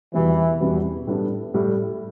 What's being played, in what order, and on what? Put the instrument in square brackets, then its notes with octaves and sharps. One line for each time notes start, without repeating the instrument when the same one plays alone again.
[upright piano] E2 B2 G3 B3 [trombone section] E3
[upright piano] E2 B2 G3 B3
A2 G3 B3 D4
A2 G3